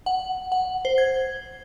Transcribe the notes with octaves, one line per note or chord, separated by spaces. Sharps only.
F#5
F#5
C5
G#6